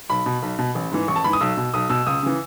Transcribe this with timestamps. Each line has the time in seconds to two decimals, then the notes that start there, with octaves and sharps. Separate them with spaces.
0.09 B1 B5
0.26 B2
0.42 B1
0.59 B2
0.75 A1
0.91 G#2 E3
1.08 A1 C#6
1.16 A5
1.24 G#2 E3 B5
1.33 D#6
1.40 B1 E6
1.57 B2
1.74 B1 D#6
1.90 B2 E6
2.06 C#2 D#6
2.23 C#3 E3